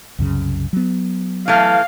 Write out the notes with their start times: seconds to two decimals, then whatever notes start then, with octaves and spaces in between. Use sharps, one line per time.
0.19 C2 F#2 C#3
0.73 F#3 B3
1.48 E3 A3 F5